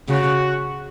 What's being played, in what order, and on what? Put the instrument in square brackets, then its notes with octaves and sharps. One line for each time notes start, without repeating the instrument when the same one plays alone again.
[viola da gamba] C#3 [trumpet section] F#4